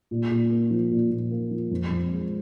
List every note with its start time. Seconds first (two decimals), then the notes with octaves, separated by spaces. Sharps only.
0.11 A#2
0.31 A#2
0.51 A#3
0.71 F3
0.91 A#2
1.11 A#2
1.31 A#3
1.51 F3
1.71 F2
1.91 F2
2.11 G#3